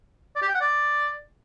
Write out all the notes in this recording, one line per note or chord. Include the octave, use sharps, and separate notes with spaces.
D5
G4
G5
F#5
D5